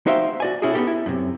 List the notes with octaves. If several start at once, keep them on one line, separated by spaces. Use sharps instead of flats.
D#4 F#4 C5 E5 F5 G5
F#4 D5 G#5
C3 C#4 E4 F#4 G#4
B3 C4 D#4 G4 A4
E4
F#2 C3